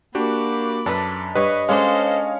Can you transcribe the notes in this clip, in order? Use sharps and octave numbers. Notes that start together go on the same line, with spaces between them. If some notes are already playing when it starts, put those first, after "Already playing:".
A#3 D4 F#4 G4 B5 D6
F#2 D4 A4 B4 A5
G2 B4 C#5 D#5
G#3 C#4 D4 A4 C5 C#5 F5